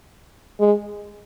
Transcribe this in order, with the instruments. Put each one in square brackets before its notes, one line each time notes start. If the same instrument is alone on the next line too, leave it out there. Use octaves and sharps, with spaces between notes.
[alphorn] G#3